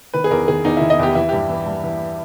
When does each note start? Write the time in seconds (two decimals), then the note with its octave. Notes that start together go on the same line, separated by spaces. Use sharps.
0.14 D#3 B4
0.24 G#4
0.31 E2 A#4
0.48 D#3 G#4
0.65 E2 D#4
0.77 D#3 E4
0.90 D#5
0.99 E2 G4
1.15 E3 E4
1.29 G2 G4
1.50 E3
1.66 G2
1.84 E3